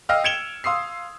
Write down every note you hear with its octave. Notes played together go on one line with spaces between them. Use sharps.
D#5 F5 G5 E6 F6
G#6 C#7 D7 E7 F7 G7
F5 C6 D#6 E6 C7